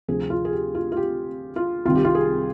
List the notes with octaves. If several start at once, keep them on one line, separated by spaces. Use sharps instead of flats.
D2 C3 F3 G#4
F4
G#4
G4
F4
F4
G4
F4
C2 C3 D#3 F4
G4
F4
G#4